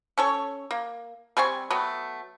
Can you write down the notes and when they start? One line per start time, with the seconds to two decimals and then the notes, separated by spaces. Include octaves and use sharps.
0.18 C#4 A4 C#5
0.71 A#3
1.37 G3 C4 G#5 C#6
1.70 F#3 A3 B3